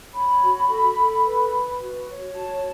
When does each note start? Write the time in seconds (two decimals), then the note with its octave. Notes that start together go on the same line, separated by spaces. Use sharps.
0.14 C#5 B5
0.42 F#4
0.70 A4
0.97 A4
1.25 B4
1.53 B4
1.81 F#4
2.09 C#5
2.36 F#4 A5